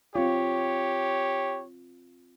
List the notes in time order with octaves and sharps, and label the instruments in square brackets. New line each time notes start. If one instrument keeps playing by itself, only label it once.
[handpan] C4 F4 [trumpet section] G4 C#5